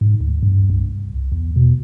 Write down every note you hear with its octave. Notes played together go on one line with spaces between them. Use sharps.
G#2
D2
G2
C2
E2
B2